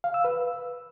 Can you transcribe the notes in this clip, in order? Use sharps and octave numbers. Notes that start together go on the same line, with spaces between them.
F5
E6
B4